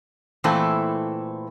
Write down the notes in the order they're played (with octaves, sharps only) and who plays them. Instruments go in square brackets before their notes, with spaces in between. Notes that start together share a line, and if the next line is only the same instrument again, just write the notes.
[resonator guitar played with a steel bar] A#2 E3 A3 C4 E4 A4